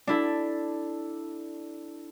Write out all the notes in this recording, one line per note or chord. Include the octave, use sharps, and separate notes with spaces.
D4 E4 A4